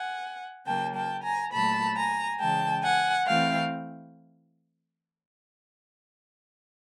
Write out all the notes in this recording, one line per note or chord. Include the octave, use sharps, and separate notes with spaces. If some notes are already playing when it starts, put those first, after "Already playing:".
Already playing: F#5 G#5
C#3 F#3 A#3 G5 A5
G5 A5
G#5 A#5
A#2 F#3 A3 A5 B5
G#5 A#5
C#3 E3 G#3 G5 A5
F#5 G#5
E3 A3 C4 E4 F5 G5